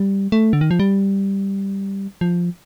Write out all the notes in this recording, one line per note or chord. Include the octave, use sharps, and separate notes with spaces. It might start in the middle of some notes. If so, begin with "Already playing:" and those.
Already playing: G3
A3
D3
D#3
F3
G3
F3